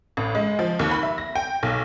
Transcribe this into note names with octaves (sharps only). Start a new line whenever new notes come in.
A1
G#3
F3
D#2
B5
E5
A#6
G5
B1